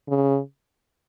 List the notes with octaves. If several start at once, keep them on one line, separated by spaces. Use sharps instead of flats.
C#3